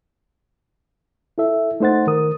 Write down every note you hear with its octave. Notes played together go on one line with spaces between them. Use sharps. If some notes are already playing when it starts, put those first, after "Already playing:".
E4 A4 E5
A3 D#4 C5 F#5 A6
D#3 A#4 D#6